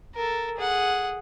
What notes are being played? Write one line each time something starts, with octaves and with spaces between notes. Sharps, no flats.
A4 A#4
G#4 F#5